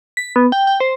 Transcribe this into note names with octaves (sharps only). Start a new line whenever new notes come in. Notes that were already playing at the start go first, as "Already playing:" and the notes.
B6
B3
G5
G5
C5